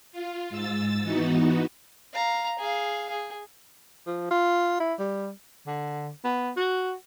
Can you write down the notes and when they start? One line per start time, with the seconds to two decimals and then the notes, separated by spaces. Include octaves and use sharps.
0.12 F4
0.50 G#2 E6 A6
1.02 E3 B3 D#4 F#4
2.14 F5 A#5
2.59 G#4 F5
3.10 G#4
4.07 F3
4.31 F4
4.80 E4
4.99 G3
5.67 D3
6.24 B3
6.56 F#4